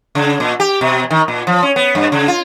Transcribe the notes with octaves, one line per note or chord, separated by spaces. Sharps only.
C#3
A#2
G4
B2
D#3
A#2
F3
C#4
B3
G2
C#3
F4